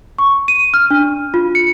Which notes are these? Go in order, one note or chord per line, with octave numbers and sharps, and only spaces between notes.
C#6
D#7
F6
D4
F4
C#7